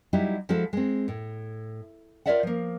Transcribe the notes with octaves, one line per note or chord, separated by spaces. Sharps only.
F#3 G3 D#4 E4 F#4 G4
F3 G#3 E4 F#4 A4
G#3 C4
A2
F4 A#4 C#5 D5 E5 F#5
F3 A#3